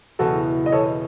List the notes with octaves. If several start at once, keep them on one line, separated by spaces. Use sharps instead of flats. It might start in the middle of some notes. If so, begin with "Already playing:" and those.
E1 E2 C#3 F#4 A4
D#5
E1 E2 C#3 A4 C#5